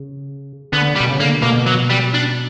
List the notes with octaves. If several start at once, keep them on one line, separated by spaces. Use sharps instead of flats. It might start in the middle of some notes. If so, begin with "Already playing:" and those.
Already playing: C#3
D3 B3
G3
B2
C#3
D3 A#3
B2 A#3
F#3
G3
D4